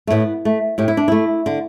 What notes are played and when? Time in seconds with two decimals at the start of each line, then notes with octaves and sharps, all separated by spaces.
0.07 A3
0.10 A2 B3
0.45 A3
0.78 A2 G4
0.88 E4
0.97 D4
1.08 A3 E4
1.46 D3